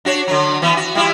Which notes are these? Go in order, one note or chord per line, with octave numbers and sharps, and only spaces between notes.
D4 F#4 C#5
D3 F#3
E3 B3
F#4
G3 E4 F4